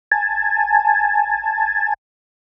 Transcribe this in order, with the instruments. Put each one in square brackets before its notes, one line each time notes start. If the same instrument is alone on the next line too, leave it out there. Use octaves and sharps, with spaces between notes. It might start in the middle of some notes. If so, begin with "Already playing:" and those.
[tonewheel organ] G#5 A5